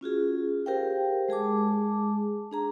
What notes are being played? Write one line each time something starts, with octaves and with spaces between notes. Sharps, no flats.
C#4 F4 F#4 G#4
G4 G#4 A#4 C5 F5 G5
G#3 G#4 A5 D6
D4 G#4 A#5